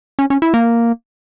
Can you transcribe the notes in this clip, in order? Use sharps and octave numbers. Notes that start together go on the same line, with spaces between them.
C#4
C#4
E4
A#3